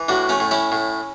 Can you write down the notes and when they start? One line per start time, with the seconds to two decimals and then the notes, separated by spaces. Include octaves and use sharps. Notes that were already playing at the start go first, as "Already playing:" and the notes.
Already playing: E3
0.08 A2 D4 F#4
0.29 A3 C#4
0.40 A2
0.51 C#4 E4
0.72 A2